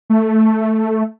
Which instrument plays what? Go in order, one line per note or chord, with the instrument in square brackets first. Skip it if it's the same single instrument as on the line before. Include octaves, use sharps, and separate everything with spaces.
[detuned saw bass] A3